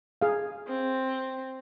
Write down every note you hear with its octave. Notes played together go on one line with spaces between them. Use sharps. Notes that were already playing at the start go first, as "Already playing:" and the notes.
G#4 F5
C4